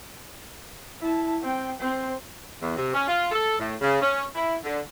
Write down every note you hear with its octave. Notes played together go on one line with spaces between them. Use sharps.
E4 A5
C4 G5
C4 C5
E2
C3
C#4
F4
A4
A2
C#3
C#4
E4
D3